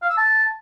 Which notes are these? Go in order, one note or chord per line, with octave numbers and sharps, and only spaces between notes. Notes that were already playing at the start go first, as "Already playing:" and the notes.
F5
E6
A5